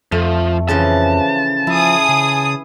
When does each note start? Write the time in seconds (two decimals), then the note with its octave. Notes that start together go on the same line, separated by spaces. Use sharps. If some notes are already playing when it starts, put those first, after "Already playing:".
0.12 F2 F3 A3
0.68 C#3 E3 F3 A5
1.67 F3 E4 G#4 D#6
2.09 C#3